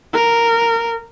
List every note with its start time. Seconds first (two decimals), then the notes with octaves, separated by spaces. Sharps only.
0.14 A#4